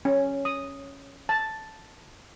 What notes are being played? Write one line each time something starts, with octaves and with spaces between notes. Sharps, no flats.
C#4
D#6
A5